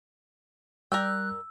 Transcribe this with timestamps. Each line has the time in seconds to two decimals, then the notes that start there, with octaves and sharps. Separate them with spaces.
0.92 G3 A#4 D5 G5 E6 F#6